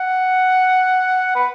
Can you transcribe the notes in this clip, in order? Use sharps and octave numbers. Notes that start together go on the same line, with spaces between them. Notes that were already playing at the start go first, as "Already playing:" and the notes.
Already playing: F#5
B4